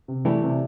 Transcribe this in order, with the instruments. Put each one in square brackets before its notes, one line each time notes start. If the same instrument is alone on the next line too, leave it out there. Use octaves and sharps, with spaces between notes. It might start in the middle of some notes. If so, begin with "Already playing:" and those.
[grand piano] C3
[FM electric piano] E3 G3 [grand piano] A3
[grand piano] C3